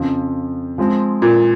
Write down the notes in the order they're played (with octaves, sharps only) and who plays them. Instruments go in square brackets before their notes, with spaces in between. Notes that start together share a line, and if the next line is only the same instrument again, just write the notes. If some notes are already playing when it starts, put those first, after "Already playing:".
Already playing: [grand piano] F2 C#3 F3
F3 G#3 C4
[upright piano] A#2